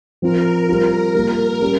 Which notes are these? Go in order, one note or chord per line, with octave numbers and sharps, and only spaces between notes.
F3 C4 F4 A#4
G3 C4 F4 A#4
G3 A#3 F4 A#4
G3 C#4 G4